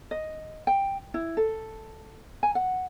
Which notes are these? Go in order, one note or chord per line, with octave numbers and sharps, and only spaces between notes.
D#5
G5
E4
A4
G#5
F#5